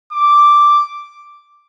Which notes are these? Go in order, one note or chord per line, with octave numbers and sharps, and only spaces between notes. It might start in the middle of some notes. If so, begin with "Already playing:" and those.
D6